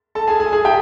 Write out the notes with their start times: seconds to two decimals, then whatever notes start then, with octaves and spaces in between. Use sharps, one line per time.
0.15 A4 A5
0.27 G#4 G#5
0.40 G#4 G#5
0.52 G#4 G#5
0.65 G4 G5